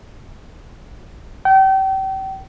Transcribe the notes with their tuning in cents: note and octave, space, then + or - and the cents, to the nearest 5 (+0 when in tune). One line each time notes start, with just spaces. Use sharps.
G5 -35